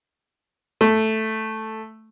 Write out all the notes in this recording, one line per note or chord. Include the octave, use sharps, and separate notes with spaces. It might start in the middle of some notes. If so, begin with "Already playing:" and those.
A3